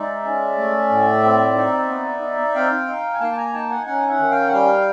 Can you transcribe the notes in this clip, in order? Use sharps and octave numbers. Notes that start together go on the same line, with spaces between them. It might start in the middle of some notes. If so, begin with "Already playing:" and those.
Already playing: G#3 D#4 D5 E5
C#4
A3
A2
C4
D#4
B3
D#4
C4 F5 G5
D#4
G#5
A#3 G5 A5
A5
G#5 A#5
D#4 G5 A5
F#5 G#5
C#4 F#5 G#5
E5 F#5
D#3
F5 G5
F#5
G3 F5 G5